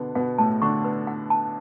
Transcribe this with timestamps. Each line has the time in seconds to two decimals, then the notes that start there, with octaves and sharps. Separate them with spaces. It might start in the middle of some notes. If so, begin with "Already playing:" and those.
Already playing: B2 D3 B3 D4
0.15 B2 B3 F#5
0.38 A2 A3 A5
0.62 D3 D4 C#6
0.85 B4
1.07 F#5
1.30 A5